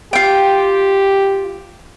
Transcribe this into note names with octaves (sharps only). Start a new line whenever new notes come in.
F4 G4 G5